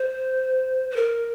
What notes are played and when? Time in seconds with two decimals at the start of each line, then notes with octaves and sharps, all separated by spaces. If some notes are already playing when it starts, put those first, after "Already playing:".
Already playing: C5
0.91 C5
0.96 A#4